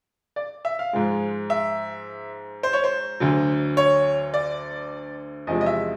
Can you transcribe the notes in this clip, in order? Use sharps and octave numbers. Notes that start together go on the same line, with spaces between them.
D5
E5
F5
G#2 F3 G#3
E5
C5
C#5
C5
D2 D3 F#3
C#5
D5
E2 C3 F3 G#3 D#5
D#5
E5